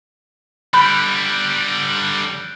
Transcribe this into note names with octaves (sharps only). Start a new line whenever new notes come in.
D3 G3 B5 F#6 G6 D7